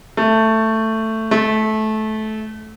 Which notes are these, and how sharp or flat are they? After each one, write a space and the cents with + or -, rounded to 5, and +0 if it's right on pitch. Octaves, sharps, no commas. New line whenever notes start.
A3 +10
A3 -20